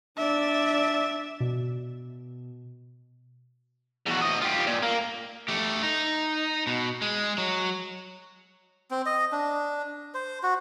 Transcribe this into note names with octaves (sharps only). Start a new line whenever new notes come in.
D4 D5 E5
B2
E2 F#4
D2 D#5
F4 G4
A#2
A#3
A3 G4
D#4
B2
G#3
F#3
C4
D#5
D4
C5
F#4